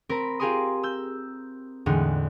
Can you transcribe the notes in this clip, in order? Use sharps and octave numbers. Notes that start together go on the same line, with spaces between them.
C4 A#4 B5 A#6
F4 G4 G#4 A#4 C6 D#6
E6 G6
E2 A2 D3 G#3 D#4